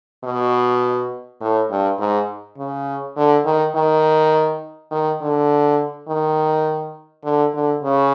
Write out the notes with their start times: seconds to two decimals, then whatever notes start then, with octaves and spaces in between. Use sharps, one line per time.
0.24 B2
1.41 A2
1.71 G2
1.99 G#2
2.58 C#3
3.17 D3
3.45 D#3
3.75 D#3
4.91 D#3
5.21 D3
6.08 D#3
7.24 D3
7.54 D3
7.83 C#3